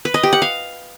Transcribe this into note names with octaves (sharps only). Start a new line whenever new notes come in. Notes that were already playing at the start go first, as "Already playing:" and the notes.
B4
D#5
G4
F#5
F5